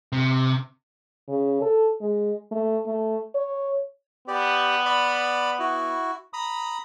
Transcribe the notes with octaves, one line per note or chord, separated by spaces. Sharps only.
C3
C#3
A4
G#3
A3
A3
C#5
B3 G4 D5
D5 B5
E4 F#4
A#5 B5 D#6